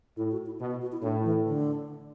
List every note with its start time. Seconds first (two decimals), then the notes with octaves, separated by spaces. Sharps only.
0.17 A2 E4
0.32 F#4
0.46 E4
0.60 B2 F#4
0.71 F#4
0.82 F#4
0.92 E4
1.02 A2 D4
1.24 E3
1.45 D3